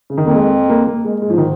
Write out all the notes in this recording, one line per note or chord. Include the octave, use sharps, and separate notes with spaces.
C#3
F2 D#3
A#3
G#3
A#3
A#3
G#3
G#2 G#3
F3
D#3